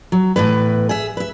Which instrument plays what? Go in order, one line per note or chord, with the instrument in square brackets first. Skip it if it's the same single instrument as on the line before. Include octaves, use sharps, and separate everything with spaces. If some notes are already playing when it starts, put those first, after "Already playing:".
[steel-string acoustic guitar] F#3
E2 A2 E3 B4
G#4 E5
B4 E5